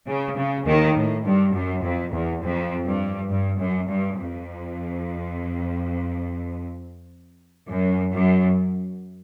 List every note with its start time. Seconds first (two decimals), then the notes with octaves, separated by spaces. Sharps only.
0.08 C#3
0.38 C#3
0.67 D#2 D#3
0.96 A2
1.25 G2
1.55 F#2
1.84 F2
2.13 E2
2.43 F2
2.86 G2
3.30 G2
3.59 F#2
3.88 G2
4.18 F2
7.69 F#2
8.14 F#2